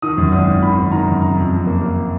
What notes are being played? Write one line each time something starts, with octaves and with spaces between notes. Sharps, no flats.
D#3 D#6
F#2
G#1 D#6
G#1
D#3 B5
G#1
D#3 A#5
F#2
C#3 A#5
F2
F2
A#3
A#3